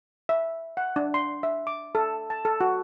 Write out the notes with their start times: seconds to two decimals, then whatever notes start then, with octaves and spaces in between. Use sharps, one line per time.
0.29 E5
0.77 F#5
0.96 D4
1.14 C6
1.43 E5
1.67 D6
1.95 A4
2.30 A5
2.45 A4
2.61 F#4